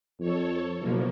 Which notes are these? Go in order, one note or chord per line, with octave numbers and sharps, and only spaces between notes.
F2 A4 C#5
F#1 B2 F3 A#3